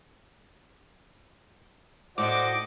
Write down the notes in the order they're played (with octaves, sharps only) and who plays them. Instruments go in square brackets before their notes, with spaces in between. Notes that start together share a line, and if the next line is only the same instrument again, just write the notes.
[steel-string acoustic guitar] A2 [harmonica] F#4 C5 D5 [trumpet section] D#5 [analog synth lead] D6